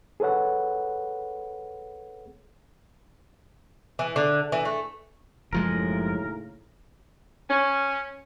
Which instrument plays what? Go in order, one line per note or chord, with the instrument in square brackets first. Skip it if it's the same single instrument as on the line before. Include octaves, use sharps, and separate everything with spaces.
[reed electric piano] G#4 A4 B4 C#5 F#5
[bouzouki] E3
D3
E3
A3
[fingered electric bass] F#1 F3 G#3 [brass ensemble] D#2 A2 C#3 [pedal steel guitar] A#4
[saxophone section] C#4